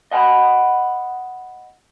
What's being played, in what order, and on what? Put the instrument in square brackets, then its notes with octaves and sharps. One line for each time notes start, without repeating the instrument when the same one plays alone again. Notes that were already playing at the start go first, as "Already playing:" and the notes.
[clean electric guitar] D#5 F#5 G#5 B5